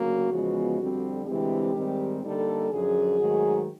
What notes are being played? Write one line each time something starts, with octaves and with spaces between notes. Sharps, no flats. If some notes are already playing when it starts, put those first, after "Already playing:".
Already playing: D2 C#3 F#3 A#3 F#4
E2 C#3 F3 G#3 B3
F2 D3 G3 C4
D2 C3 E3 G#3 C4 G4
G#2 D#3 G3 C4
D3 G3 A#3 D#4 A4
F#2 D3 F3 G#4
G#2 D#3 F#3 A3